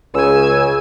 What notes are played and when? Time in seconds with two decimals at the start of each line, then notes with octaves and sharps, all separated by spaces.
0.15 C#2 C#3 G#5 E6